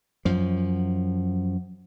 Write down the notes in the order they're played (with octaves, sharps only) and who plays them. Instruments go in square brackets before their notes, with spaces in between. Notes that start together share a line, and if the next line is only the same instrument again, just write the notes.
[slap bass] F#2 F3